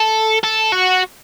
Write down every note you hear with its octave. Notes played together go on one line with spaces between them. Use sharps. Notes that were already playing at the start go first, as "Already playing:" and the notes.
Already playing: A4
A4
F#4